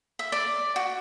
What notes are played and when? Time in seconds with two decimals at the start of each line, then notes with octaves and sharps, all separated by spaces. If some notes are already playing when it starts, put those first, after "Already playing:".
0.19 E5
0.32 D5
0.76 F#4